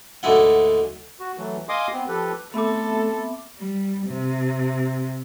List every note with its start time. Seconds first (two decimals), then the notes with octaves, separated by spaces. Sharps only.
0.23 D2 G#2 G#3 E4 F#5
1.20 F#4
1.38 E3 F#3 A3
1.69 D#5 F5 G#5 C6 D6 D#6
1.93 B3 C4
2.08 F3 G4 A4 B4
2.54 A3 B3 C4 A4 E5 B5 D6
3.57 G3
4.08 C3